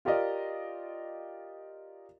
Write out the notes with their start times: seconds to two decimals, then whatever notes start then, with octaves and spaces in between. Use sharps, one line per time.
0.05 F4 G4 A#4 D5 D#5